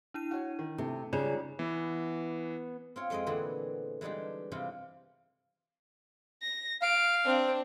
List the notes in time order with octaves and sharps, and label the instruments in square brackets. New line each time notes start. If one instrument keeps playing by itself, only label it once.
[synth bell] D4 E4 D#7
[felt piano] F#4 C#5
D#3
[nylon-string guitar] C3 [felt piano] A3
[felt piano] G#2 G3 [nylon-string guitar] C#3 [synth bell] F4 C#5 D5
[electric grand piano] E3 [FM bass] B3
[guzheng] C4 F4 C#5
F2 G#3 C4 G#4 D#5
A#2 D3 E3 B3 C4 G#4
E3 G3 G#3 D4 D#4 G4
C3 E3 G3 F4 G4
[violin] A#6
[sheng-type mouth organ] F5 [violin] D7
[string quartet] C4 [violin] D4